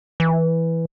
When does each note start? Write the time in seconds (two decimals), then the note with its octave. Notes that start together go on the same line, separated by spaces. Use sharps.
0.20 E3